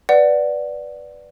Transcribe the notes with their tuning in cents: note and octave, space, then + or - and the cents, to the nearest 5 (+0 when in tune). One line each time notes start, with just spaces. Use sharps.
B4 +0 D5 +0 F#5 +0